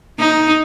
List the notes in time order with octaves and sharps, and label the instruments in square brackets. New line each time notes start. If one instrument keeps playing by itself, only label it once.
[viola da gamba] D#4